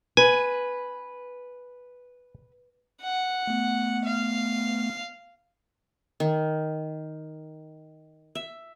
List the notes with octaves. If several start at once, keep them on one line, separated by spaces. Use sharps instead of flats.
B4 G#5
F#5
A3 B3
F5
D#3
E5